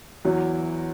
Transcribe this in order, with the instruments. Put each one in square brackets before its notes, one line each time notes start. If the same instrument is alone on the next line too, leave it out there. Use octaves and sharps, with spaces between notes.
[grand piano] E2 E3 [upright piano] F#3